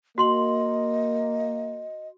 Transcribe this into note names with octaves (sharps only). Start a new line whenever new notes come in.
A#3 F#4 D#5 C6 F#7